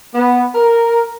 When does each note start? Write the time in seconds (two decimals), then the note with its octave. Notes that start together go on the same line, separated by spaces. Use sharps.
0.15 B3
0.55 A#4